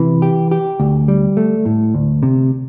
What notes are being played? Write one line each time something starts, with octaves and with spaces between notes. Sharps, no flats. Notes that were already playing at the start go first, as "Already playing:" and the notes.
Already playing: C3 E3
G4
G4
D2
G3
A3
A2
D2
C3